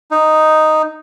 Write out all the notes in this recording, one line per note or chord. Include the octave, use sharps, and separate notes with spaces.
D#4